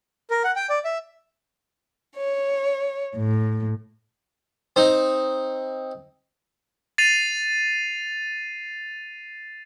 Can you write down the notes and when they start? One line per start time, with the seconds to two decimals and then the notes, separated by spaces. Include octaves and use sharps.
0.30 A#4
0.44 F#5
0.56 G5
0.70 D5
0.85 E5
2.17 C#5
3.16 A2
4.76 C4 D#4
6.98 A6 C7 D#7 F7